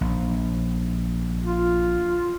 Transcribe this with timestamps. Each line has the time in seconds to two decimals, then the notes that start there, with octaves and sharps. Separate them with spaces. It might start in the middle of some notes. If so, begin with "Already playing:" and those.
0.01 A#1
1.43 F4